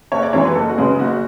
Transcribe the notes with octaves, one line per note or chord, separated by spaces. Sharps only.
F#1 C#5
D5
F#2 E3 G#3 C#5
B4
F#1 A4
F#4
F#2 C#3 G#3 B3
F#1 F#4